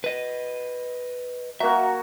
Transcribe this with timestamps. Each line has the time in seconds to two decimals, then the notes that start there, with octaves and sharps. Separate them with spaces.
0.04 B4 D#5
1.60 F#3 A#3 F#4 E5